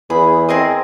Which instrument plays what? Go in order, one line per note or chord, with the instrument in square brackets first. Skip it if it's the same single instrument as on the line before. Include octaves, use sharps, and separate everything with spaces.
[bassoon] E2 [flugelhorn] G#4 [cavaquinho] B5
[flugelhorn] C4 [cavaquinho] G#4 A#4 D#5